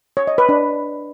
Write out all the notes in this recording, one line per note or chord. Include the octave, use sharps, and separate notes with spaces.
C#5
D#5
B4
D4